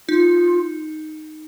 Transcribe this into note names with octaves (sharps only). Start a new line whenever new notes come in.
D#4 F4